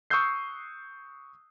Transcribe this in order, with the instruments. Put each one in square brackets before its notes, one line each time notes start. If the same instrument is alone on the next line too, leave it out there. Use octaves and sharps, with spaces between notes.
[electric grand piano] C#6 D#6 E6 F#6 G6 C7